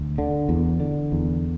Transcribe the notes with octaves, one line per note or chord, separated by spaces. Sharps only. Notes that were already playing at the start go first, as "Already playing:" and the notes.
Already playing: D2
D3
E2
D3
E2